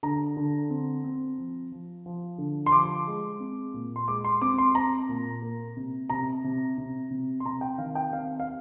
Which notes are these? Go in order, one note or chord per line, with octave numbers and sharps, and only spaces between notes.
D3 A#5
D3
C4
C4
F3
F3
F3
D3
C6
F3 D6
G#3
C4
A#2
C6
G#3 D6
C6
C4 D6
C6
C4 A#5
A#2
A#3
C3
C3 A#5
C3
C3
C3
C6
C3 A#5
G5
D#3 F5
G5
C4 F5
F5